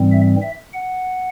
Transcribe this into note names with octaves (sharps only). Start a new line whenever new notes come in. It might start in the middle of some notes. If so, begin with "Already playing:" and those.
Already playing: G#2 E3 G3 C4
E5
E5
F#5